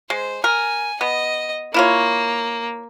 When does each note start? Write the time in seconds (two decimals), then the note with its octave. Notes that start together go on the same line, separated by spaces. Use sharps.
0.10 G#3 C5
0.44 A#4 G#5
1.01 B3 D#5
1.74 A#3 E4 F4 C#5